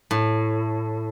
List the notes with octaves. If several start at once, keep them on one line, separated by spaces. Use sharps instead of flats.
A2